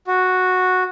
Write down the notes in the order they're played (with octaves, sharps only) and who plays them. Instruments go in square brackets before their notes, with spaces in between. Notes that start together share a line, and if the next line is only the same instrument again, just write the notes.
[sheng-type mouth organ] F#4